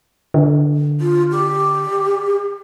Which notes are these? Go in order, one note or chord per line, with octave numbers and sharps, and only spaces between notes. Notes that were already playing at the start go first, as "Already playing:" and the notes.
D3
F4
G4